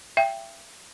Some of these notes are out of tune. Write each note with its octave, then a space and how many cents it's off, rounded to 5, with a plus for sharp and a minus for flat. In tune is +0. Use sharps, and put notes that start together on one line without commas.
E5 +35 G5 +5